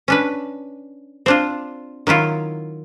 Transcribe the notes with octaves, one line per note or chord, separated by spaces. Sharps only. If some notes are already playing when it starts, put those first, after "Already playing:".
C#4 D4 B4
C4 D4 F4
D#3 F#3 E4 F4